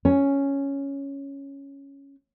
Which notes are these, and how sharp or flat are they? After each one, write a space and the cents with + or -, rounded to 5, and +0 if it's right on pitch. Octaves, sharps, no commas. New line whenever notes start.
C#4 +0